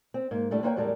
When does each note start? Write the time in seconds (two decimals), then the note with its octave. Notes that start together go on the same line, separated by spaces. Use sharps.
0.14 C4
0.31 G#2 A#3
0.51 A2 G3 A3 D4 E4
0.63 A#3 D4 E4 B4 C#5 G5
0.76 E2 A2 G3 G#3 A#4 A5